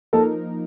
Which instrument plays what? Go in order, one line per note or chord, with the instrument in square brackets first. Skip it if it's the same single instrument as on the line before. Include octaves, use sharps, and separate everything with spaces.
[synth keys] F3 A#3 D#4 A#4 [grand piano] A4